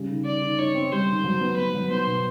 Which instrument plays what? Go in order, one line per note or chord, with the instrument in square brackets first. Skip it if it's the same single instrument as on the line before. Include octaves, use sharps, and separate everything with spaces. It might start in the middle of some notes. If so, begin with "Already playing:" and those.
Already playing: [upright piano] C#3 G3
D#3
[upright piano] D#3 [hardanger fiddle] D5
[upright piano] D#3
[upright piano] D#4 [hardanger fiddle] C#5
[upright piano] C4
[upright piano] G3 [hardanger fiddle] C5
[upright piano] D#3
F#3
B3
[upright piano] B3 [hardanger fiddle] B4
[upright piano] F#3
[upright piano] B3 [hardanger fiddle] C5
[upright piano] B2